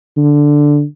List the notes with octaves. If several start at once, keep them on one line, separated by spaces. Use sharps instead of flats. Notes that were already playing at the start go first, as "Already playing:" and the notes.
D3